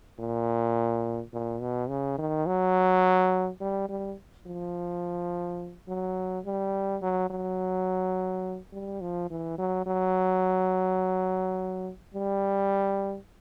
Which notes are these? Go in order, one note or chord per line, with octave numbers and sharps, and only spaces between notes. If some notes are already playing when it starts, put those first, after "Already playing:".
A#2
A#2
B2
C#3
D#3
F#3
G3
G3
F3
F#3
G3
F#3
F#3
G3
F3
E3
F#3
F#3
G3